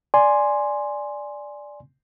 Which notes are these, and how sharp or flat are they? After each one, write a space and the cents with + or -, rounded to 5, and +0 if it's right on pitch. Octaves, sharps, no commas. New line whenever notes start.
D5 +0 G#5 +0 C6 +0